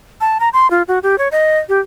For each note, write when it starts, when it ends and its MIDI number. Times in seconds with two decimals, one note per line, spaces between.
0.21 0.38 81
0.40 0.49 82
0.53 0.70 84
0.71 0.82 65
0.88 0.99 66
1.03 1.18 67
1.18 1.28 73
1.32 1.58 75
1.69 1.79 67